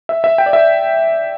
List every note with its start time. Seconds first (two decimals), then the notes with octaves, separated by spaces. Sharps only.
0.09 E5
0.24 E5
0.38 G5
0.46 D5
0.53 E5